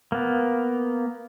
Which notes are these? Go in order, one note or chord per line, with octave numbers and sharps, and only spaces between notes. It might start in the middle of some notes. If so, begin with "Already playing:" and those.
A#3 B3